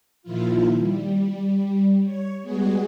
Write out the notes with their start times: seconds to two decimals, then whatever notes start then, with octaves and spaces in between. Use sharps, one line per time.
0.23 A#2 D#3 F3 E4 F4
0.75 G3
2.04 C#5
2.41 G3 G#3 B3 F#4 G#4